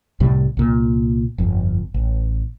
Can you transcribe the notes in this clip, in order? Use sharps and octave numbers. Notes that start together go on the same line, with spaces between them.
C2 A2 C3 G3
C2 A#2
G1 F2
A1